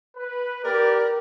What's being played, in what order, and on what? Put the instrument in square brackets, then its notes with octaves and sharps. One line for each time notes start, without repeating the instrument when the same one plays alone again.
[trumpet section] B4
[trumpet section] G4 D5 [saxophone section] A#4